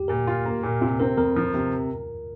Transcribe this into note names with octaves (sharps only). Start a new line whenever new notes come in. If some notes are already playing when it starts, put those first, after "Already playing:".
Already playing: G4
A#2 A#4
F4
A#3
A#2
C3 F4
C4 A#4
F2 A#4
F3
C3